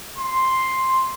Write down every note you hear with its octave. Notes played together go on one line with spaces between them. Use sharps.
C6